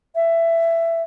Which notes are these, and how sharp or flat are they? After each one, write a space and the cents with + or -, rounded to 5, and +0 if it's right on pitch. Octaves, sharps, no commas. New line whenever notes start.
E5 +15